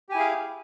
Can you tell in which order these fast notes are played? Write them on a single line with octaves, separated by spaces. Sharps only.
G4 G#5 E4 G#4 F5